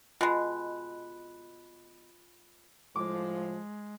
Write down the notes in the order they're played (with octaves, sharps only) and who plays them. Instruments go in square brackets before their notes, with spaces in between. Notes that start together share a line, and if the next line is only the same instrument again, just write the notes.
[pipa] B2 G#3 [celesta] F4 B5 F#6
[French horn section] A2 F3 [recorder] G#3 [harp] D6